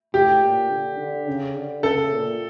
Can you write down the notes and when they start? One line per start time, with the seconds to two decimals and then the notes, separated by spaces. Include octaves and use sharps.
0.14 A2 G4
0.42 A#2
0.70 D3
0.99 D3
1.27 C#3
1.55 D3
1.83 C#3 A4
2.12 A#2